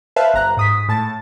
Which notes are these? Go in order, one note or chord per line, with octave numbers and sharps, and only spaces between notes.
B4 C5 E5 F5 A5 F#6
G1 A#5 F#6
G#2 D#6 B6
A2 A5 A6